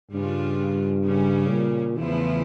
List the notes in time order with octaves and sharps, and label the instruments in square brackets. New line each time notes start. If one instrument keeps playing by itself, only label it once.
[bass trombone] G2 [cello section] C#3 G3 D4 F4
[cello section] C#3 G3 C#4
[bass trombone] A#2
[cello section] E2 C#3 F3 A3 E4 [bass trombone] E3